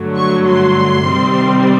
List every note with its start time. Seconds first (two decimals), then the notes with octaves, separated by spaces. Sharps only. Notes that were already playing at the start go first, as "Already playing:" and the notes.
Already playing: G2 D3 F#3 A3
0.16 C#6
0.47 C6
1.06 C3 D#3 G3 C4